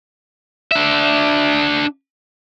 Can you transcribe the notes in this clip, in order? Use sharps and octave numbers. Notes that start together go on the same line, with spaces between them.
D4 E5